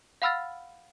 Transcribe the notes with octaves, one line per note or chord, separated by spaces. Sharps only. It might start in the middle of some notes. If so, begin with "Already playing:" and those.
F5 F#5 B5 E6 F6 A6